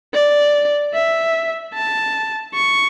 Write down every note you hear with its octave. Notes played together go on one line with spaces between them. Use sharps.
D5
E5
A5
C#6